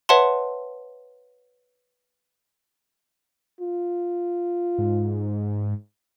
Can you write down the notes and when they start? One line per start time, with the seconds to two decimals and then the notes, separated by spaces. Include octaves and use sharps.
0.09 B4 C#5 E5 F#5 A5 C6
3.61 F4
4.78 G#2